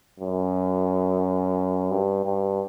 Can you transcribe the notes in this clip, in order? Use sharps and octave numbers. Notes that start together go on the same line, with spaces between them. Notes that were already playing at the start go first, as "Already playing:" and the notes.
F#2
G2
G2